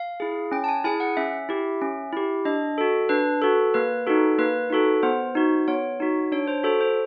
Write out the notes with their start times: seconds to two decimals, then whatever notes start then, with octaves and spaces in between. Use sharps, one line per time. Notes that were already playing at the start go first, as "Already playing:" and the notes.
Already playing: F5
0.20 E4 G#4
0.52 C#4 G5
0.64 A5
0.68 G#5
0.84 E4 G#4 G#5
1.00 F#5
1.17 C#4 E5
1.49 E4 G4
1.82 C#4
2.13 E4 G4
2.45 D4 D#5
2.78 F#4 A4
3.09 D4 B4
3.42 F#4 A4
3.74 A#3 B4
4.07 D#4 F#4 A4
4.39 A#3 B4
4.70 D#4 F#4 A4
5.03 B3 C5
5.35 D#4 F#4
5.68 B3 C#5
6.00 D#4 F#4
6.32 D4 C#5
6.48 C5
6.63 F#4 A4 C5
6.81 C5